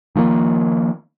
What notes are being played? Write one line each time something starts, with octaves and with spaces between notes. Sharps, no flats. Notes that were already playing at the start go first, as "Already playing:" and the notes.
D#3 F3 G3 A#3